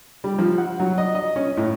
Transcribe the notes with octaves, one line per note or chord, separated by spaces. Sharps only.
G3
F3
F#5
F#3
D#5
D#5
C#4
A2